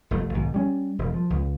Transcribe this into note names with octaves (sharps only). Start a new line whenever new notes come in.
F1 A3
B1 G#2 D#3
G3 C#4
E1
F3
C#2